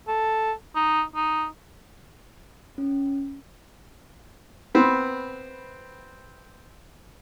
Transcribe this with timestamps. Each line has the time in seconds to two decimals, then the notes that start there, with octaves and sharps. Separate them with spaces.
0.08 A4
0.75 D#4
1.16 D#4
2.78 C#4
4.75 B3 C4 B4